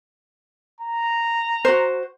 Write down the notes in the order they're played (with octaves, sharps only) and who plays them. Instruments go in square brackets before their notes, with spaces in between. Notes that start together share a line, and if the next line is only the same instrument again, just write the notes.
[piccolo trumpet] A#5
[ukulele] F#4 C5